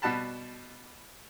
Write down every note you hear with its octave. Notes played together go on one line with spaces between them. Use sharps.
B2 G3 F#5 A5 B5